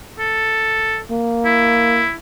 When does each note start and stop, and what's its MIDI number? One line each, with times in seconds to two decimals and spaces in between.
0.19 0.99 69
1.10 2.04 58
1.45 2.13 64